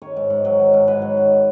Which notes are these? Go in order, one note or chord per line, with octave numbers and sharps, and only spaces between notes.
D#3 C#5
G#2
G#2
F#3
D#3
G#2
G#2 B4
F#3
D#3